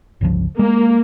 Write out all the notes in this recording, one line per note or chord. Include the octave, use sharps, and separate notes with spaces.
G1 C#2 F3
G#3 A#3